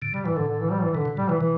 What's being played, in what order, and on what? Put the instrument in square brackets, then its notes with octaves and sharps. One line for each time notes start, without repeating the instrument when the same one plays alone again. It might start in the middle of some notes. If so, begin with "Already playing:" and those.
[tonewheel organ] A2 D3
[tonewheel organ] B2 [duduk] G3
[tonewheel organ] A2 [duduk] E3
[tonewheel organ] A2 [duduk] D3
[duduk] D3
E3
G3
E3
[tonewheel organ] B2 [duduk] D3
[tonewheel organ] B2
[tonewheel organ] A2 [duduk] G3
[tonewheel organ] B2 [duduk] E3
[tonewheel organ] B2 [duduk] E3